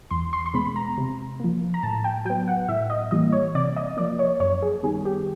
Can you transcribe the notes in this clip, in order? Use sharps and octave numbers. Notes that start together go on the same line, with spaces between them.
E2 C6
C6
C6
B2 G#3 B3 B5
A#5
C3
F3 A#3
A#5
A2 A5
G5
F#3 B3 G5
F#5
A2 E5
D#5
E3 G3 A#3 D#5
C#5
C3 D5
D#5
F3 A#3 D5
C#5
F#2 C#5
G#4
D#3 G3 B3 G#4
G4